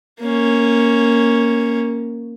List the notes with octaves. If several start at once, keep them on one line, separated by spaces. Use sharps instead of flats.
A#3 C#4